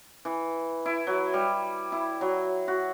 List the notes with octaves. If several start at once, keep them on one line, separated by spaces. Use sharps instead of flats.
E3
E4
F#3
G3
E4
F#3
F#4